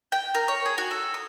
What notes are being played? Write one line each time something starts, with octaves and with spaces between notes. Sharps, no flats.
G5
A#4
C#5
G#4
F#4
A4
D#6